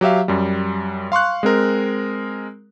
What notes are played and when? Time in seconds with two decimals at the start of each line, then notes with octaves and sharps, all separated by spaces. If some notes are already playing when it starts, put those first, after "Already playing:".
0.01 F#3 G4 E5 F5
0.28 F#2 G3
1.12 F5 C6 C#6 F#6
1.43 G#3 C4 A#4